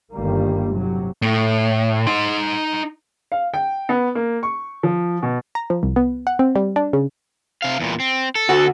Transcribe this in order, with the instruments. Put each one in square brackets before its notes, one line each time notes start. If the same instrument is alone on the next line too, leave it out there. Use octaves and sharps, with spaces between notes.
[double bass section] G1 D#3 G3 A#3
A2 C3 F#3
[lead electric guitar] A2
D#4 C6
[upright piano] F5
G5
B3
A#3
C#6
F3
B2
[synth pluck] A#5
F3
C2
B3
F#5
C4
G3
D4
C#3
[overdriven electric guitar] C3 F5
E2 A#2
C4
A4
[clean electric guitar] D2 F#4 F#5